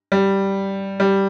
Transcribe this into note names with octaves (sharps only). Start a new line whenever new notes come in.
G3
G3